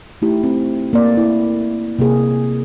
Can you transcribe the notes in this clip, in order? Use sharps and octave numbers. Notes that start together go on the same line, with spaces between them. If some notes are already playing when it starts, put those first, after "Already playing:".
A3 D#4 E4 G4
C4
A#3 D5
E4
C3 A#3 G#4